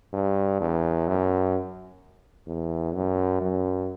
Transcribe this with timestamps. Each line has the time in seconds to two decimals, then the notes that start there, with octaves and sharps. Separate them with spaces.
0.13 G2
0.60 E2
1.08 F#2
2.47 E2
2.95 F#2
3.41 F#2